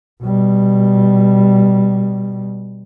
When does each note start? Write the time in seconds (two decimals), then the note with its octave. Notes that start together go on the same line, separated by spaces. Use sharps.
0.23 B2 G3